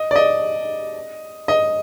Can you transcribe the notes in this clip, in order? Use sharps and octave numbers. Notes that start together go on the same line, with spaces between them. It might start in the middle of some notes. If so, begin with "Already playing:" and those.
Already playing: D#5
D5
D#5
D#5